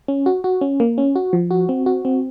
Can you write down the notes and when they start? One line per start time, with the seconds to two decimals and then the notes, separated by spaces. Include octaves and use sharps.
0.08 C#4
0.26 F#4
0.44 F#4
0.61 C#4
0.80 A#3
0.98 C#4
1.16 F#4
1.33 F3
1.51 F#4
1.69 C4
1.86 F#4
2.05 C4